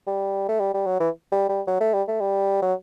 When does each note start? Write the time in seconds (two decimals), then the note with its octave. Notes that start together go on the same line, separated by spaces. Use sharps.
0.07 G3
0.49 A3
0.60 G3
0.74 G3
0.87 F#3
1.00 E3
1.32 G3
1.49 G3
1.67 F#3
1.81 A3
1.94 G3
2.08 A3
2.21 G3
2.62 F#3